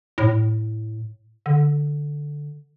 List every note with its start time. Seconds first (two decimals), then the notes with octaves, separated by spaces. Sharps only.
0.18 A2
1.46 D3